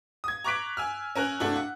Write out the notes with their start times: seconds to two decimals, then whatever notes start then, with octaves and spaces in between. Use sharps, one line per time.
0.24 D#6 G#6
0.44 A#5 C#6 D6 F#6 B6 D7
0.77 G#5 E6 F6
1.15 C#4 A#4 G#5 F#6
1.40 C3 A3 D4 E4 F#4
1.56 F#5